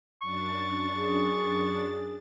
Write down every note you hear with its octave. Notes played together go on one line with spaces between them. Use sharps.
F#2 D4 C#6 A6
G#4